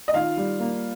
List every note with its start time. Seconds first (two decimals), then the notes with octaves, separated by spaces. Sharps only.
0.08 D#5
0.14 D#3 F4 F5
0.37 G3
0.60 A#3